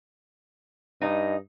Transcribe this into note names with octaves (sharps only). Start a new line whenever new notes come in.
G2 D#4 D#5